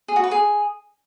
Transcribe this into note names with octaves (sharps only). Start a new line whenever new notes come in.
G#4
F#4
B4
G#4